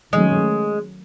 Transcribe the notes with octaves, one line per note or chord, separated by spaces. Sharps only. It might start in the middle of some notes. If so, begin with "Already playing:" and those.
D#3 F#3 G#3 A3 C#4